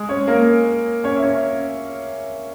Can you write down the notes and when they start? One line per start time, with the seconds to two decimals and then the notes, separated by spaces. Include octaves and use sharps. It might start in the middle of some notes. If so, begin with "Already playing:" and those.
Already playing: G#3 G#4
0.09 C#4 C#5
0.28 A#3 A#4
1.04 C#4 C#5
1.16 E5
1.23 C#4 C#5